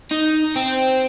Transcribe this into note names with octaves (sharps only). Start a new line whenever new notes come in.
D#4
C4